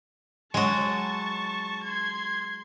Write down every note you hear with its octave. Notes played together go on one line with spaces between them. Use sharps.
F#3 G#3 A5 C#6
C6 G#6